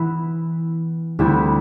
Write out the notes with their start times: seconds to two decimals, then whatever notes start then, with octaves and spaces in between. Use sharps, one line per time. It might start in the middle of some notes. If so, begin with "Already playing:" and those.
Already playing: E3 B3 E4 B4
1.19 D2 D3 G3 C4 E4